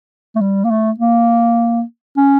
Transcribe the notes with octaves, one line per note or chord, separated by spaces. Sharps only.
A3
G3
A#3
A3
A#3
C#4